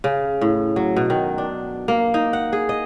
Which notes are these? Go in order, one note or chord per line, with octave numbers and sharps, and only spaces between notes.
C#3
A2
F#3
B2
D#3
D4
A#3
D#4
F#5
G#4
D#5